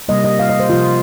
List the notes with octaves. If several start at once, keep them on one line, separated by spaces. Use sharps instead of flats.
C3 G3 A#3 D#5
D#5
F5
D#5
C5
C3 F3 A#3 F4